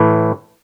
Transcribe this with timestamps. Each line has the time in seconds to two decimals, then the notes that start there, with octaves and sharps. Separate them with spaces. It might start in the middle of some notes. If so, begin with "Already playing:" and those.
Already playing: A2 E3